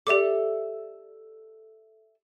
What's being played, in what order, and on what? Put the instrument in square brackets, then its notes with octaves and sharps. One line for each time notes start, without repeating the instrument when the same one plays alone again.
[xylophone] G4 D6 [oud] A4 D5 E5